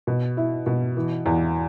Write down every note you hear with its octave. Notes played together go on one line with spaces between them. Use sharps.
B2
E4
B2
E3
E2